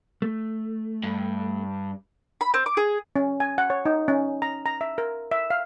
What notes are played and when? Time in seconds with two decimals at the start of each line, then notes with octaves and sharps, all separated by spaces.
0.22 A3
1.04 G2
2.41 B5
2.54 C4
2.66 D6
2.77 G#4
3.16 C#4
3.40 G#5
3.58 F#5
3.70 C#5
3.85 D#4
4.08 C#4
4.42 A#5
4.66 A#5
4.81 E5
4.98 A#4
5.31 E5
5.50 F5